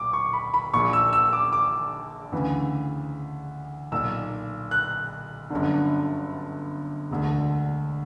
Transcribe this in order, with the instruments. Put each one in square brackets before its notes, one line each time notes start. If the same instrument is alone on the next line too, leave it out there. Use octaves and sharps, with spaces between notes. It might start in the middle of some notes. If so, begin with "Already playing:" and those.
Already playing: [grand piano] B1 A#2 D6
C#6
B5
B5
A#1 A#2 C#6
E6
E6
D6
D6
D2 C#3 E3
B1 A#2 E6
F#6
G1 F#2 D3
E1 D2 D3